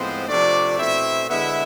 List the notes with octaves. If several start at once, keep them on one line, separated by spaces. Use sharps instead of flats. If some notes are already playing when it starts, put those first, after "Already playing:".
Already playing: A2 F3 G#3 B3 C4 C5
C3 F3 A3 D4 D5
B2 A3 C4 E4 E5
D3 G#3 B3 E4 E5